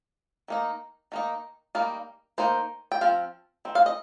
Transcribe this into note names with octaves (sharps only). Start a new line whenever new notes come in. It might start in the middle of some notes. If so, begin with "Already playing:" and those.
D#3 A#3 D#4
D#3 A#3 D#4
G3 A#3 D#4 F5
D#3 A#3 D#4 C5
G5
F3 C4 F5
D#3 C4
F5
D#5